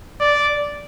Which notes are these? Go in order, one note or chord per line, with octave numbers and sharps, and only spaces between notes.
D5